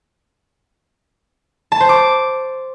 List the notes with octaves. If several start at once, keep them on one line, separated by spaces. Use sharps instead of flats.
A5
C5
D6